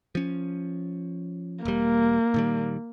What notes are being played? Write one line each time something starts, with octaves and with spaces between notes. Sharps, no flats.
F3 C#4
E1 G3 A#3
A#2 D#3 G3